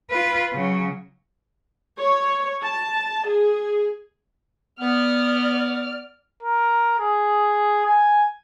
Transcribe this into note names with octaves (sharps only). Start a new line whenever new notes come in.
F4 B4
C#3 F#3
C#5
A5
G#4
B3 D5 F6
A#4
G#4
G#5